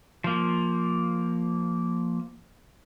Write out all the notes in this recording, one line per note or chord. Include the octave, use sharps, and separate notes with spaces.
F3 A#3